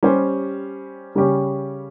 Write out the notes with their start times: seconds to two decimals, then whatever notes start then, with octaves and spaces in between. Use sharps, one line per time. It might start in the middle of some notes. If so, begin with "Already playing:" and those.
0.03 G3 C#4 G4 C5
1.15 C#3 G3 C#4 G4 C#5